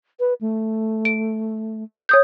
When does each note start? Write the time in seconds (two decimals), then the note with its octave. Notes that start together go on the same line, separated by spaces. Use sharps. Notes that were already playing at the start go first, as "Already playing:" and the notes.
0.20 B4
0.41 A3
1.05 D7
2.09 C#5 D#6 G6